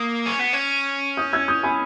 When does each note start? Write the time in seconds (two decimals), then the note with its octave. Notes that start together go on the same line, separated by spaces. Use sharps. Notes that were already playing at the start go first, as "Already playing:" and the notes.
Already playing: A#3 D#6
0.26 C#4
0.39 B3
0.53 C#4
1.17 D#6 G6
1.33 E6 G#6
1.48 D#6 G6
1.63 G#5 B5